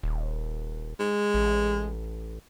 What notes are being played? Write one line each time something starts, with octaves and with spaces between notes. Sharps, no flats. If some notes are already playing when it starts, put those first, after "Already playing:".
D#1
G#3
A1